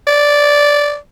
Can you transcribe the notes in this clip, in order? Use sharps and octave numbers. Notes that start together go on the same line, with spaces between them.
D5